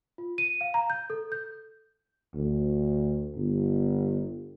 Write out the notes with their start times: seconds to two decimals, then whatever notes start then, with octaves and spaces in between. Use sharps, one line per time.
0.18 F4
0.38 D#7
0.61 F5
0.74 A#5
0.90 G6
1.10 A4
1.32 G6
2.34 D2
3.36 G1